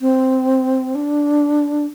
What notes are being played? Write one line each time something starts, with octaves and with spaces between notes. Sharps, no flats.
C4
D4